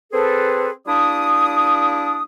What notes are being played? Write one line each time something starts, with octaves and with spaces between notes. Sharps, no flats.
C4 G#4 A4 B4
G3 A#3 D4 E4 D#6